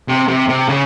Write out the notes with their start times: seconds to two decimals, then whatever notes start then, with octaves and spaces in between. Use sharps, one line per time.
0.08 C3
0.28 C3
0.48 C3
0.68 C#3